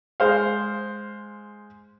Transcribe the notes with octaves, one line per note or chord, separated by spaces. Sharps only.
G#3 C5 F5